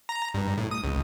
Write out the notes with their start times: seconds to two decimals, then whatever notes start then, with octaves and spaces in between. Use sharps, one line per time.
0.09 A#5
0.34 G2
0.57 A2
0.71 D#6
0.84 C#2